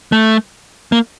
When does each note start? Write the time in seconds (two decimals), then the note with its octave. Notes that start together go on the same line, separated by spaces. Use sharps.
0.12 A3
0.92 A#3